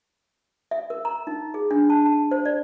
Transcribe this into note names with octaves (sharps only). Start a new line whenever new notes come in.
E5
A#4
A#5
D#4
G#4
D4
A5
A5
C5
D5